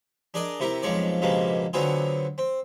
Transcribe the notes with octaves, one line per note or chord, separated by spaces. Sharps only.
D4 G#4 A#4 D5 D#5
C3 E4 G4 A#4
B1 F2 F3 G#3 C#5 D5
C#2 G2 B2 F3 G#3 A#3
D3 F#3 B3 C4 F4 G#4
C4